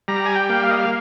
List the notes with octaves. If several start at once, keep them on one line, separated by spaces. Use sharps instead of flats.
G3 A#5
G#5
G5
A#3
F5
D#5
F5